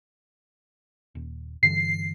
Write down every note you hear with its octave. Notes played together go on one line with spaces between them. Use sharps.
D#1
G2 D3 E3 C7